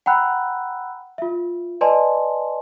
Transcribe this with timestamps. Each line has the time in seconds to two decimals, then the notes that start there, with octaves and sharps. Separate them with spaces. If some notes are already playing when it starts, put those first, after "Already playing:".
0.06 F#5 G5 A#5 B5 E6 F#6
1.18 F4 E5
1.81 B4 D5 D#5 G#5 A5 C6